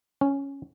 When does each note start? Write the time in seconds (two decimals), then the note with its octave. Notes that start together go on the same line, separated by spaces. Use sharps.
0.21 C#4